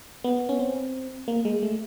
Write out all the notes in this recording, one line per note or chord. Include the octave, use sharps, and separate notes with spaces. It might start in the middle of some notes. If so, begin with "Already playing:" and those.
B3
C#4
C4
A#3
G#3
A3